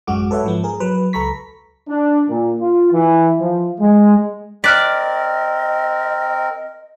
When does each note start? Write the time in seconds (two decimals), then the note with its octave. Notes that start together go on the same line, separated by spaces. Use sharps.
0.07 A1 F#2 F#3 G#3 F#4 D6
0.31 A4 B4 C#5 E5 F#5
0.44 G#2 F3 B3
0.64 G#4 A#4
0.80 F#3 B4
1.13 C#2 A4 A#5 B5 C#6 B6
1.89 D4
2.29 A#2
2.60 F4
2.92 E3
3.40 F3
3.80 G#3
4.64 C4 A#4 D5 D#5 F6 F#6 B6